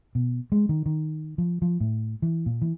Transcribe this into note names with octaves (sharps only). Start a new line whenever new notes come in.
B2
G#3
D#3
D#3
F3
F3
A2
E3
A#2
E3